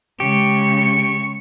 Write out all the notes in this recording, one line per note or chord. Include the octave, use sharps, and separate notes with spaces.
C#3 G#3 G4 C#6